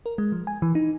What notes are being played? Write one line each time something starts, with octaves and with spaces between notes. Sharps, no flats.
A#4
G#3
F3
G#5
E3
D#4